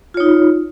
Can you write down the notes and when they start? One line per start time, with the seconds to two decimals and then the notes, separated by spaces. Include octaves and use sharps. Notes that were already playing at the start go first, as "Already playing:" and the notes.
0.14 F4
0.17 C#5
0.20 D#4